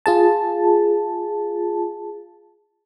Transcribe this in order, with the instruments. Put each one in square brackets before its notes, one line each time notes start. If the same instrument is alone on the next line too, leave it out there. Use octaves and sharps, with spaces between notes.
[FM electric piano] F4 G#4 A5